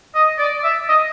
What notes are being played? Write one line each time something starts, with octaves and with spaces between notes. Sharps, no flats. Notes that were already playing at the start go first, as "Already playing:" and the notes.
D#5
D5
E5
D#5